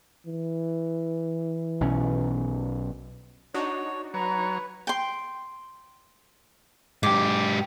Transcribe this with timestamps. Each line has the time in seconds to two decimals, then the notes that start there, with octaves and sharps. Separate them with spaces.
0.26 E3
1.81 B1 B2 C#4
3.54 D4 D#4 F#4 C#5
4.14 F#3 B4 C#5 A#5
4.87 G5 C6
7.03 G#2 G4 D6